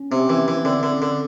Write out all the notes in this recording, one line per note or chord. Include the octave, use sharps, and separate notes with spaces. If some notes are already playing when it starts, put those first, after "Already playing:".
Already playing: C#4
C3 C4
C#4
C4
E3
B3
E3
B3
D3 C4
D3
C#4
D3